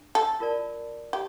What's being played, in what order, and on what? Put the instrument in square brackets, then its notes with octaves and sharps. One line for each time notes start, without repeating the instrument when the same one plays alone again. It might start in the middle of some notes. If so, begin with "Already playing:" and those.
Already playing: [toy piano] D4
[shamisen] A4
[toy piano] F4 A#4 D5 A5
[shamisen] G4